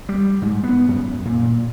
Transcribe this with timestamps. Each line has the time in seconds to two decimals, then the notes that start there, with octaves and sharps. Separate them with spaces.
0.09 G3
0.42 G#2
0.64 B3
0.89 F#2
1.25 A#2